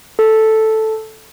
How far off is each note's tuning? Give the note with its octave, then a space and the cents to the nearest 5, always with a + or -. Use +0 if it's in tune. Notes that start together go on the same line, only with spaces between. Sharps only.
A4 +0